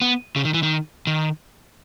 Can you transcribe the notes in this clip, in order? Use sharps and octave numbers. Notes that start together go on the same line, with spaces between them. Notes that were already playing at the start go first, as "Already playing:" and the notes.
B3
C#3
D#3
E3
D#3
D#3